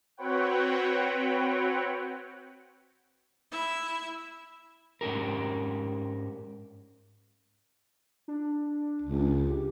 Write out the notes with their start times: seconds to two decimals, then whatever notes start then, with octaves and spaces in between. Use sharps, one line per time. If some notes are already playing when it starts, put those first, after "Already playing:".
0.17 C4 F#4 B4 C#5 F#5 G5
3.51 E4 E5
5.01 G#2 C#4 E4 G4 A#4
8.28 D4
9.02 C#2
9.50 G4